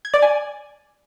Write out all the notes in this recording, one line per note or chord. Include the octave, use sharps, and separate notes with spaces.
G#6
D5
G#5